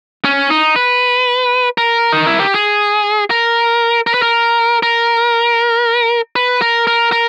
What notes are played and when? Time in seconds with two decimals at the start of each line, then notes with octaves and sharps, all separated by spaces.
0.25 C#4
0.50 D#4
0.76 B4
1.78 A#4
2.13 D#4
2.27 E4
2.40 G4
2.54 G#4
3.31 A#4
4.07 A#4
4.14 B4
4.22 A#4
4.83 A#4
6.36 B4
6.62 A#4
6.87 A#4
7.12 A#4